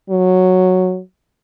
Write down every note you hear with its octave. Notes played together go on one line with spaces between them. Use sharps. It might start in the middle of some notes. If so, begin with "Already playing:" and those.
F#3